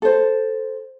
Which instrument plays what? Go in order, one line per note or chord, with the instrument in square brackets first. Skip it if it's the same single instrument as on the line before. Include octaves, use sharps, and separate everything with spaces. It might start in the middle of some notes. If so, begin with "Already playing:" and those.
[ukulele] A4 C5